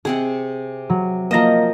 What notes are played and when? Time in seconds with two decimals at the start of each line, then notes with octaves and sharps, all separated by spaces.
0.05 C3 C4 G#4 F#5
0.90 F#3
1.31 F3 A#3 A#4 D#5 A#6 E7